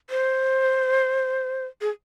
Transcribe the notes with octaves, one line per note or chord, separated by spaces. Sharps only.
C5
G#4